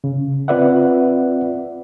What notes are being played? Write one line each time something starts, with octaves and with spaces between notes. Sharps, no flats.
C#3
C4 F4 B4 D5 E5 F#5